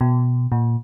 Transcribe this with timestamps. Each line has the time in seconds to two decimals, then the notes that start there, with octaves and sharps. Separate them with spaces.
0.01 B2
0.52 A#2